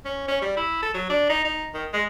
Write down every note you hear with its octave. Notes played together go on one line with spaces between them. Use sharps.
C#4
C#4
G3
E4
A4
F#3
D4
D#4
D#4
D#3
G#3